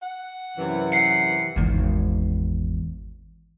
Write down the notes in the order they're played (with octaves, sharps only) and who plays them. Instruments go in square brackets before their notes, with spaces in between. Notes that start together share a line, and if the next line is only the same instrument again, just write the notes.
[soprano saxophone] F#5
[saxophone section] F#2 C3 E3
[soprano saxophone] F#5 [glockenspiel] C7 C#7
[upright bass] G#1 E2